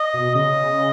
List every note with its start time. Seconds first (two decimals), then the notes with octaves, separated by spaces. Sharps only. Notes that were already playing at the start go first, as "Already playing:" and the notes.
Already playing: D#5
0.14 B2
0.34 C#3 D#5